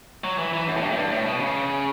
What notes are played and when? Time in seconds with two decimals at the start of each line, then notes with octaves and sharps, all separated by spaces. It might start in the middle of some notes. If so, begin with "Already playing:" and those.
0.24 F#3
0.38 E3
0.53 E3
0.67 F#2
0.77 A2
0.81 G2
0.91 A2
0.96 G2
1.12 A2
1.25 B2
1.40 C#3